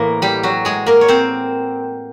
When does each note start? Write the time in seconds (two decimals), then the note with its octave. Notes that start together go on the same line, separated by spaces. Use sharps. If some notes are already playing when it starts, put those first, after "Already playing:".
Already playing: A2 E3 A#3 A#4
0.22 G3 G4
0.43 F#3 F#4
0.65 G#3 G#4
0.86 A#3 A#4
1.01 C#5
1.08 C4 C5